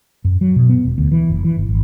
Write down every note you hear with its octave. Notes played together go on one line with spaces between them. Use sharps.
F#2
F#3
B2
B3
E1
D2
E3
F#1
E3
G1
G#1